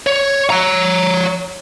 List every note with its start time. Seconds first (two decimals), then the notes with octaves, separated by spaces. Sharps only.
0.07 C#5
0.50 C#5 A#5